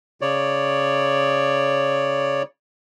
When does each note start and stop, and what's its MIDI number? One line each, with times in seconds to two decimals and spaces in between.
0.21 2.42 49
0.21 2.42 73
0.21 2.42 74